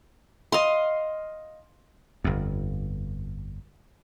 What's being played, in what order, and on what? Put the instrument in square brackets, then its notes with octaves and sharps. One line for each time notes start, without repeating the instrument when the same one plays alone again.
[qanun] D#5 F5 C6
[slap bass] G1 F2